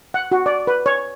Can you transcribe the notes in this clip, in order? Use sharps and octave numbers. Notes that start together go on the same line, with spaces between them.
F#5
F#4
D5
B4
C#5